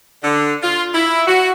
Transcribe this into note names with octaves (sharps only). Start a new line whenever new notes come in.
D3
F4
E4
F#4